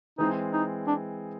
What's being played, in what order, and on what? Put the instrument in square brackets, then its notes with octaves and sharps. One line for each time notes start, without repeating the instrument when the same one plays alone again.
[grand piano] E3 G#3 C4 [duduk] D#4
[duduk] D#4
D4